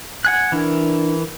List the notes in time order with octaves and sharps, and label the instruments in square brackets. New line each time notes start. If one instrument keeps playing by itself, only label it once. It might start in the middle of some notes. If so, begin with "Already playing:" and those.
[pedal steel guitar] F#5 G#5 F#6
[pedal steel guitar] E3 A#4 [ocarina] D4